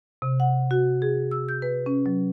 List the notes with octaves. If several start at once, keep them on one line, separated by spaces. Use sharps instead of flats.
C3
F#5
F#4
G#4
E6
G6
B4
C#4
F#3